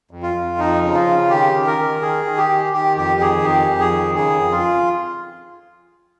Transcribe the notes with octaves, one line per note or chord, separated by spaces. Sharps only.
F2
F4
F2
F3 D#4
C#3
F4
C#3
D#3 G4
D#3
A#4
D#3
D#3 G#4
D#3
G4
D#3
D#3 G4
F2 G4
D#3 G#4
F2 G4
F2
G#4
D#3
C#3 G#4
F2
F4